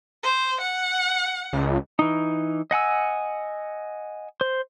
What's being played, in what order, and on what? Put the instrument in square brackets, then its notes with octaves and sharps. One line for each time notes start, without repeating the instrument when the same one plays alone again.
[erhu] C5
F#5
[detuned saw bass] C#2
[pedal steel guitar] E3 D#4
D#5 F#5 G#5 E6
C5